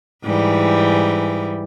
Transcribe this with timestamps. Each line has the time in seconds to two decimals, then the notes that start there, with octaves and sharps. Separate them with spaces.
0.24 G#2 E3 G3